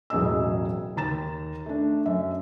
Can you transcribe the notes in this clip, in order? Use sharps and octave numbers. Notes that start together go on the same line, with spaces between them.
E1 A1 F#3 G#4 D#5 E6
D#2 A#5 A6 E7
A3 D4
F#2 E5